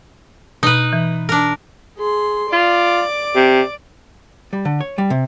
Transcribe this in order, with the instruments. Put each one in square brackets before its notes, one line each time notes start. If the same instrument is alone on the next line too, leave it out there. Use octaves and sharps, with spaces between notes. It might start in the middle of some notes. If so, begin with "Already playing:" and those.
[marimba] B2 [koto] D#4 B4
[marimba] E3
[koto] D4 A#4
[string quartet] G#4 C6
[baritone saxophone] F4 [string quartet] D5 D6
[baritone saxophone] C3
[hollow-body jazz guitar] G3
D3
C#5
G3
C3